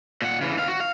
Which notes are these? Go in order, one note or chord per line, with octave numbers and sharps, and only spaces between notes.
A#2 F#5
C#3 E3
D#2 F5
F#4
F5